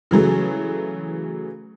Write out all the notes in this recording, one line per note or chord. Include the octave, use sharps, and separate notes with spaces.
C#3 E3 F#3 A3